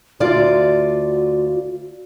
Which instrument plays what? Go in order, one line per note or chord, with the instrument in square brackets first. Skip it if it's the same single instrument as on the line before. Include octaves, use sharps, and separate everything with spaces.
[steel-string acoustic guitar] D2 F4 D5 [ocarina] F#4